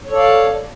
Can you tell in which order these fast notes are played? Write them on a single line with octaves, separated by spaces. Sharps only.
C#5 A4 D5 F5 A5